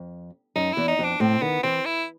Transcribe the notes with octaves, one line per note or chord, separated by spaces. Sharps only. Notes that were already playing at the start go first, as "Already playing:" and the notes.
Already playing: F2
F#2 D#4
E2 E4
D#4
F2
D4
A2 C4
D#3 B3
E3 C4
E4